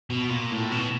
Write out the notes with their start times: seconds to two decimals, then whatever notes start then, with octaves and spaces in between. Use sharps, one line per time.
0.10 B2
0.30 A#2
0.51 A2
0.72 B2